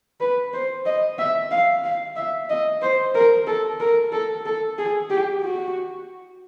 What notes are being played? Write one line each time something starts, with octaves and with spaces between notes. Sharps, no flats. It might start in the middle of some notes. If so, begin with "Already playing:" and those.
B4
C5
D#5
E5
F5
F5
E5
D#5
C5
A#4
A4
A#4
A4
A4
G#4
G4
F#4